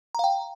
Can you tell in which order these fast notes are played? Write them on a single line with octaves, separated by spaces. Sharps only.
A#5 F5 G5